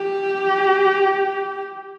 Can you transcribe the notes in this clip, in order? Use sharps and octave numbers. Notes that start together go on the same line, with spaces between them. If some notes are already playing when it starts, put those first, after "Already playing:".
Already playing: G4